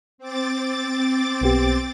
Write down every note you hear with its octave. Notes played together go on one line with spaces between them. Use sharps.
C4 D6 A6
B1 B3 G4